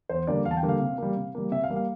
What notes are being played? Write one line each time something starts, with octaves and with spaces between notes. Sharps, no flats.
E2 C5
D3 G3 A#3 D5
E2 F5
A5
G5
D3 G3 A#3
F5
C3
G3 A#3
C3
G3 A#3
C3 E5
F5
G3 A#3
F5